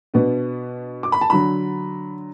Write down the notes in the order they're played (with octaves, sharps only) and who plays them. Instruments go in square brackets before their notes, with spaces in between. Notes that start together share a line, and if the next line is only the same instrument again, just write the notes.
[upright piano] B2 B3 D4
D6
B5
A5
D3 F#3 D4 B5